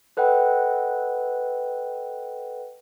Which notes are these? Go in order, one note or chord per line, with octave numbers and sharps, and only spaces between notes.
A4 B4 D#5 F#5 G5